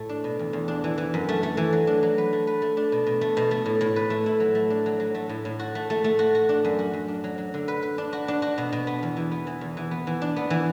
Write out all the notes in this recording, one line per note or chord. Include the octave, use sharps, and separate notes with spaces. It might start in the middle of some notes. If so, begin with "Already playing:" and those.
Already playing: A2 A3
D4
B2
E2
E2
D4
E3
E3
F#2
A3
A3
E3
F#3
D4
F#3
B4
A3
B4
A3
D4
B2
B2
A3
B2
A3
A2
A2
B4
A3
E4
F#3
A3
D4
F#3
F#3
A3
A2
A2
F#4
A3
A3
A3
F#4
F#4
D4
F#2
F#4
F#2
D4
F#3
F#3
D3
B4
B4
D4
F#4
D4
F#4
B2
B2
B3
E2
E3
B3
E3
E2
E3
B3
E3
D4
B3
E3